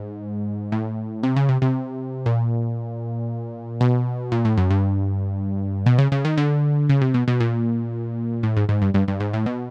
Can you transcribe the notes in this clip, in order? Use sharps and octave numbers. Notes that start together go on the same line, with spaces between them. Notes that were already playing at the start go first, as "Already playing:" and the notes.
Already playing: G#2
A2
C3
C#3
C3
C3
A#2
B2
A#2
A2
F#2
G2
B2
C#3
C#3
D#3
D3
C#3
C3
B2
B2
A#2
A2
G#2
G#2
G2
G2
G2
G#2
A2
B2